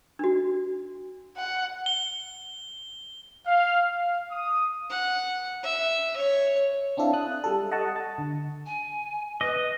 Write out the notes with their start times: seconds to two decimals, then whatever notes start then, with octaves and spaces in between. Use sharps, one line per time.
0.19 D4 F#4
1.37 F#5
1.86 G7
3.46 F5
3.91 F5
4.31 D#6
4.90 F#5
5.63 E5
6.17 C#5
6.97 C4 D4 E4 A4 E5 F5
7.13 A5 D#6 F#6
7.44 G3 A4
7.71 D#5 F#5 A5 C#6
7.96 A5
8.18 D3
8.66 G#5
9.41 B4 D#5